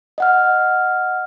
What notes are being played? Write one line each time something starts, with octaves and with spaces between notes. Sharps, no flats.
D#5 F#5 F6